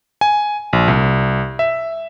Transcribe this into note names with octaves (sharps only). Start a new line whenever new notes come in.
G#5
A#1
C2
E5